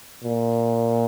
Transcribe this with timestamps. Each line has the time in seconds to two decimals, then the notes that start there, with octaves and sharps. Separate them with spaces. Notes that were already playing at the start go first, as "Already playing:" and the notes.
0.24 A#2